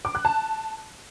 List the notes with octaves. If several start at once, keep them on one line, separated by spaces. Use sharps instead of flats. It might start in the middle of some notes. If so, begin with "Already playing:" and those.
D6
F#6
A5